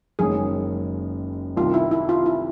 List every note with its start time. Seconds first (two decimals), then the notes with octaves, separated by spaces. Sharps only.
0.19 F#1 F#2 D#3 G#3 C#4 G#4
1.57 C2 C3 D#3 G3 F4
1.74 E4
1.91 E4
2.09 F4
2.26 E4